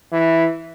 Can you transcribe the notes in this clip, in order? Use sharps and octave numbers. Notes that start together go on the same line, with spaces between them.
E3